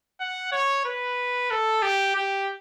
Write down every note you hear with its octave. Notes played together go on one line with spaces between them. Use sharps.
F#5
C#5
B4
A4
G4
G4